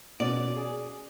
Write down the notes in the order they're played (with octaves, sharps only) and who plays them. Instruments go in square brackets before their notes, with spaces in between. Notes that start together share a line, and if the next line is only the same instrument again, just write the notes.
[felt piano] B2 C#4 F#4 [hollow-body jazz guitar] D5
[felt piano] G#4